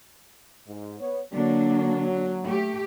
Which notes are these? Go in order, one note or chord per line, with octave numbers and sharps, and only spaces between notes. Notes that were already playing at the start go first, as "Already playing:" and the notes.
G#2
B3 C#5
D3 F#3 A#3 D4
A3 G4